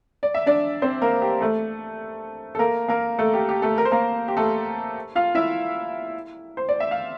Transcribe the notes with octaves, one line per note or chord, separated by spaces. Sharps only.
D5
E5
D4 D5
C4 C5
A#3 A#4
G4
A3 A4
A4
A#3 A#4
A#3 A#4
A3 A4
G4
G4
A3 A4
A#4
C5
A#3 A#4
G4
A3 A4
F4 F5
E4 E5
C5
D5
E5
F5